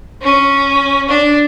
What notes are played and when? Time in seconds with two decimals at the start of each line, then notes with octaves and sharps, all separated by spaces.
0.22 C#4
1.09 D4